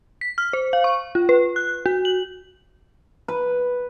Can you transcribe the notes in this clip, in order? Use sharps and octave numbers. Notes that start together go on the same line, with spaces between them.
B6
F6
C5
F5
C#6
F4
B4
F#6
F#4
F#7
B4